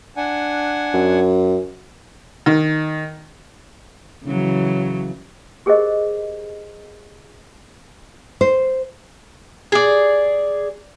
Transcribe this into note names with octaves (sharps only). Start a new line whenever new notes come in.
D4 F#5 G#5
F#2
D#3
C#3 E3 F#3
G4 G#4 A#4 C5 D#5
C5
G#4 D5